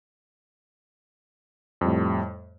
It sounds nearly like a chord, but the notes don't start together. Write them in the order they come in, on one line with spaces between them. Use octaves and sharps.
F2 G3 A2